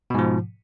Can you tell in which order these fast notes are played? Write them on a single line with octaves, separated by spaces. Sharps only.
B2 G#2 F3